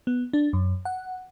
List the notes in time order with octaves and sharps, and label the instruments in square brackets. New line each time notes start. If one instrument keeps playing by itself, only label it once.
[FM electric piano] B3
D4
F#2
F#5